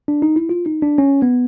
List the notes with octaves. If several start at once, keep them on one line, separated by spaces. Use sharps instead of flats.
D4
D#4
E4
F4
D#4
D4
C#4
B3